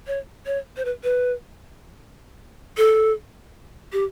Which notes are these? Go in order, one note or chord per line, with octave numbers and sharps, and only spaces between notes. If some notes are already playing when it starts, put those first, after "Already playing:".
C#5
C#5
C5
B4
B4
A4
G4